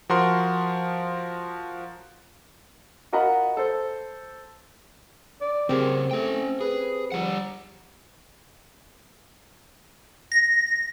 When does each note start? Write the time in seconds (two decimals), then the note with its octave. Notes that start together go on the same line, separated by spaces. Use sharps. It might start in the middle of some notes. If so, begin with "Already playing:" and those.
0.09 F3 F#4 A#4 C6
3.12 F4 F#4 A#4 D#5 F#5 B5
3.57 A4 C5
5.41 D5
5.69 C#3 C4 G4 G#4 A#4
6.11 A3 C#4 G5
6.61 G#4 B4
7.12 F3 G3 F#5
10.32 A#6